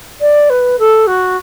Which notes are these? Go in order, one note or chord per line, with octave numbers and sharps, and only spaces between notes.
D5
B4
A4
F#4